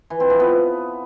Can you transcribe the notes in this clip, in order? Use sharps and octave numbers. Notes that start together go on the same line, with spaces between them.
E3
C4
F3
B3